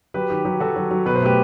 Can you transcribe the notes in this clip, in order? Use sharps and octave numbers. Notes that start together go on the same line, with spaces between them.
F#3 G4 B4
D#3 G4
F#3 G4
F#3 F#4 A4
F#3
F#3
B2 B4
C5
A3 G4 B4